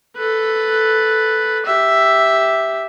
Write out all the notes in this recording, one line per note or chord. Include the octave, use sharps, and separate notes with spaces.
A4 B4
G4 E5